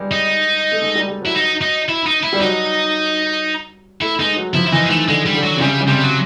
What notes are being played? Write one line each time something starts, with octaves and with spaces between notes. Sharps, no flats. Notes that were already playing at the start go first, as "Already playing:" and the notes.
Already playing: G3 G#3
D#4
A3
G#3
G3
G3
F#3 E4
D#4
D#4
E4
D#4
E4
G3
F#3 D#4
A3 E4
G#3 D#4
F#3
F3 E4
E4
E3 D#4
G#3
D#3 A3
D3 G#3
G3
D3
F#3
C3
C#3 G3
C#3
C3 G3
F#3